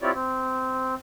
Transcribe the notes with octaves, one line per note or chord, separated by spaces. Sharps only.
C4 E4 F4 G4 C#5 D5
C4